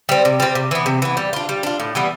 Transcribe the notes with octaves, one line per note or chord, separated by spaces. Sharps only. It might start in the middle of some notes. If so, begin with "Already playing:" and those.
G3 C4
C3
G3 C4
C3
E3 B3
C3
E3 B3
G3
D4 F4
G3
D4 F4
A2
E3 G3 B3